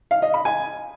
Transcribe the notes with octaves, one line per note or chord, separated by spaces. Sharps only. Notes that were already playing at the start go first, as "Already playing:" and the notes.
F5
D#5
B5
G#5